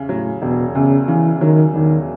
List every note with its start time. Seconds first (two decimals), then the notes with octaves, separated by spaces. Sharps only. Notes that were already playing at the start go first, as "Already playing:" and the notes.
Already playing: E2 C#3
0.09 A2 F#3
0.42 E1 B2
0.75 E2 C#3
1.08 C#3 E3
1.41 D#3 F#3
1.74 E1 D#3